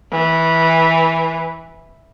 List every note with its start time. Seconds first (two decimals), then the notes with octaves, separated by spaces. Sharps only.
0.12 E3